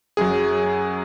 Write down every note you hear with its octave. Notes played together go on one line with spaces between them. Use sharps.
F#2 F#3 G#4